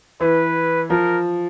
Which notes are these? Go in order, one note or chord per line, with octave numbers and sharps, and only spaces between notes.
E3 B4
F3 A#4